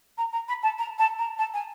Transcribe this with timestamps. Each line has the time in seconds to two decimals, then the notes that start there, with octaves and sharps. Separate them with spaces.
0.18 A#5
0.32 A#5
0.48 B5
0.63 A5
0.78 A#5
0.99 A5
1.18 A#5
1.39 A5
1.54 G#5